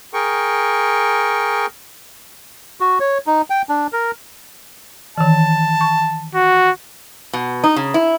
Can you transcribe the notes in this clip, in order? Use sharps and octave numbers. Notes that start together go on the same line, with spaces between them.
G#4 A#4 G5 C#6
F#4
C#5
D#4
G5
D4
A#4
D#3 E3 A5
C#6
F#4
B2
D#4
C#3
E4